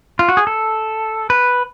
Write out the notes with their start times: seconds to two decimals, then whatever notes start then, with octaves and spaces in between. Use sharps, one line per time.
0.19 F4
0.29 F#4
0.37 G#4
0.47 A4
1.30 B4